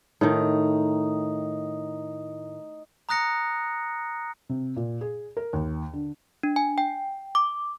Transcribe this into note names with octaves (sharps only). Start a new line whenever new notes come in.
A2 D#3 D#4
A#5 D#6 F#6 A#6 C#7
C3
A#2
G#4
A#4
D#2
D3
D4
G#5
G5
D6